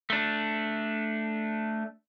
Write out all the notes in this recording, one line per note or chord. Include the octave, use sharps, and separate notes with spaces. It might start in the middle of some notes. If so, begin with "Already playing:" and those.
A3 D4